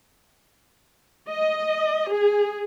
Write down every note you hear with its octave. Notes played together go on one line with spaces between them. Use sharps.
D#5
G#4